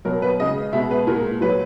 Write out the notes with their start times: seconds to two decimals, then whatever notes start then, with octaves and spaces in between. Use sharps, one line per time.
0.05 B2 F#3 A#4
0.22 B4
0.39 C#3 G#3 D#5
0.73 B2 G#3 E5
0.91 B4
1.07 A#2 G#3 A#4
1.41 A#2 F#3 B4